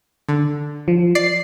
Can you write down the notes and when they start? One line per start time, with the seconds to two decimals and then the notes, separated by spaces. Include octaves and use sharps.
0.29 D3
0.88 F3
1.15 D5 C7